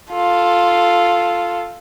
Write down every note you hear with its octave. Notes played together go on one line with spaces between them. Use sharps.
F4 A4